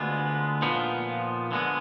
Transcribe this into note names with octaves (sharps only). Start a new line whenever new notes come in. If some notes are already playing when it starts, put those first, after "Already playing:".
Already playing: D2 D3 G#3 B3 F4
A#2 F3 B3 D#4
D3 G#3 B3